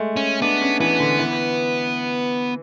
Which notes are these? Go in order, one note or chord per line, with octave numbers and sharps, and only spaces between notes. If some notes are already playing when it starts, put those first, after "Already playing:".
Already playing: G#3 A3
C#4
B3 D4
C#4
E3 B3
D3
E3